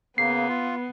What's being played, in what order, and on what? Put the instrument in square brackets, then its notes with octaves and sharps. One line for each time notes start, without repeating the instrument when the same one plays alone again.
[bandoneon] C#3 A#3 [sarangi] B3 [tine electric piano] C7
[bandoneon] F4